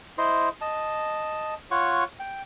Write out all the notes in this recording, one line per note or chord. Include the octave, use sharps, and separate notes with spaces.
E4 C5 D#5 C6
D#5 A5
F4 C#5 F#5 C#6
G5